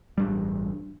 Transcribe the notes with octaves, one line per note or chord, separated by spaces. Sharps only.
A1 G2 G3